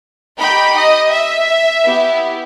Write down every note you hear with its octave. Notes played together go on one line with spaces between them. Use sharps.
D#4 G4 G5 B5
D#5
E5
B3 E4 G4